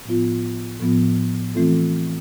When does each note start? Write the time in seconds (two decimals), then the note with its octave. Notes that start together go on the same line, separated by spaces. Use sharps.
0.05 A2 F3 B3 F4
0.80 A2 F3 B3 F4
1.55 E3 A3 C4 F4 A4